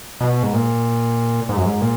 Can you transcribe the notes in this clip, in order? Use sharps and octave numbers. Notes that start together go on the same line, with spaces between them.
B2
G#2
A#2
G#2
F#2
G#2
A#2